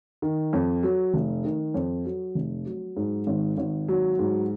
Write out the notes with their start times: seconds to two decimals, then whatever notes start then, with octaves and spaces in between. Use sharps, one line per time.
0.22 D#3
0.53 F2
0.83 F#3
1.14 F1
1.44 D#3
1.74 F2
2.05 F#3
2.35 F1
2.66 F#3
2.96 G#2
3.27 G#1
3.58 G#1
3.89 F#3
4.19 G#2